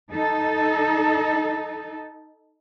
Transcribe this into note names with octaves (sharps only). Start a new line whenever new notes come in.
D#4 A4